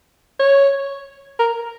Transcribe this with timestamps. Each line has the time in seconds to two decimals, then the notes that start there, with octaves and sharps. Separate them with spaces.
0.40 C#5
1.39 A#4